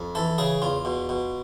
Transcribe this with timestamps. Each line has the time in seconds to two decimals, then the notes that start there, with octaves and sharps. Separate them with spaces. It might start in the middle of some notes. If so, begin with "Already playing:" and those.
Already playing: F2
0.15 E3 A4
0.38 C#3 G#4
0.62 E2 F4
0.85 B2
1.09 B2